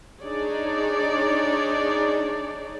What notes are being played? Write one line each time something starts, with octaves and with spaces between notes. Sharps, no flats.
D4 D#4 G#4 C#5 D5